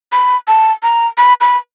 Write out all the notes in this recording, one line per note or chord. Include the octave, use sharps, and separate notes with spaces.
B5
A5
A#5
B5
B5